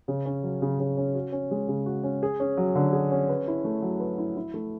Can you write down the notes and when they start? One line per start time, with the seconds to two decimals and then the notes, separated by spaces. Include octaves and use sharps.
0.08 C#3
0.25 C#4
0.43 F#3
0.62 C#3
0.80 C#3
0.97 C#4
1.14 F#4
1.32 C#4
1.51 G#3
1.68 C#3
1.86 F#4
2.04 C#4
2.23 G#4
2.40 C#4
2.57 F#3
2.75 D3
2.93 G#4
3.11 C#4
3.29 B4
3.48 E4
3.65 A3
3.82 F#3
4.00 B4
4.18 E4
4.37 E4
4.54 A3